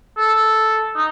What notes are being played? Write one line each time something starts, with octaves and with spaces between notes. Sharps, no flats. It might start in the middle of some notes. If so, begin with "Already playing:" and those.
A4
D#4